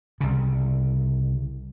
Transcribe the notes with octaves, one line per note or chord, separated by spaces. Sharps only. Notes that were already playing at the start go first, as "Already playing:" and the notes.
C2 C#3